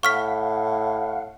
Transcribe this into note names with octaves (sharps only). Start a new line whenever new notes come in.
A2 F5 F#5 C#6 F6 B6